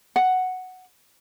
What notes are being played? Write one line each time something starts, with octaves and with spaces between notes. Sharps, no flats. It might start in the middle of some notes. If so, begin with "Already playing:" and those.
F#5